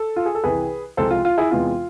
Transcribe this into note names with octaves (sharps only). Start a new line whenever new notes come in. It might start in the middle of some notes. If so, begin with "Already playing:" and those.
Already playing: A4
F4
G#4
A4
C2 C3 E3 G#4 B4
C2 C3 F3 G#3 A4 C5
F4
F4
E4 G#4
E2 C3 E3 G#3 F4